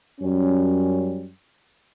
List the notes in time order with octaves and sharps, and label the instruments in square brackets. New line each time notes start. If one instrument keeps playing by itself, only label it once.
[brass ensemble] F#2 G3 C#4